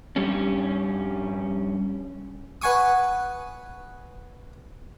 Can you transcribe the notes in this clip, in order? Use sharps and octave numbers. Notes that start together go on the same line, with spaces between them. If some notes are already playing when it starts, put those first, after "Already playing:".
G2 G3 C#4
B4 F#5 G#5 C#6 D#6